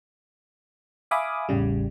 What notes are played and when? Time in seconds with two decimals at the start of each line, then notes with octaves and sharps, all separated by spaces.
1.11 E5 F5 G#5 B5 D6 D#6
1.49 A1 E2 C#3 G3